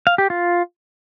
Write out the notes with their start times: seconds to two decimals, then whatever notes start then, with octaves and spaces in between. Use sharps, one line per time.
0.07 F5
0.18 G4
0.30 F4